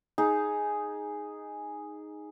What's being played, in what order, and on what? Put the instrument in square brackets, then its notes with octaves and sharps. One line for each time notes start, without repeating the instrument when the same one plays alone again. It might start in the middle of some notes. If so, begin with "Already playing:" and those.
[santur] D#4 G#4